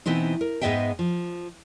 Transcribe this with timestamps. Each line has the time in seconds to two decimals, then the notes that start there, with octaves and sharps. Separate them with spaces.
0.06 B2 E3 B3 C4 D#4
0.41 A#4
0.61 G#2 G#3 B3 D#5 E5 G5
0.99 F3